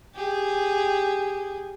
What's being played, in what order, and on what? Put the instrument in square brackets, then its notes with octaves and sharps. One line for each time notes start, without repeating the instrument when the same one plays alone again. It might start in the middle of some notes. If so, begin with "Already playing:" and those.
[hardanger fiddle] G4 G#4